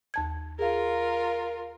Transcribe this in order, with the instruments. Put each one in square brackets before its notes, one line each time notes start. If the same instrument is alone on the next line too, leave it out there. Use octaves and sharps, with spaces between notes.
[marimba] D#2 A5 G#6
[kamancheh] F4 A#4 [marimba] G#4 F5